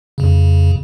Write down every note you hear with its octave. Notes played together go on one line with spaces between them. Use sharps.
F2 C#3